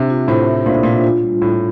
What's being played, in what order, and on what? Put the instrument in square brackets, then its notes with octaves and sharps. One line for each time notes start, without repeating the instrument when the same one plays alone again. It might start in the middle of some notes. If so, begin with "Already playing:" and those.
Already playing: [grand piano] C3 [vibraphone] D4 C5 E5
[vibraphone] F4
[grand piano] A2 [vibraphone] C5
[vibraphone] E5
[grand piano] A#2 [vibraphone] D4
[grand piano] A2
[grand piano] A#2 [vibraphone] F4
[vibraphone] F4
G3
[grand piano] A2 [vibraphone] G3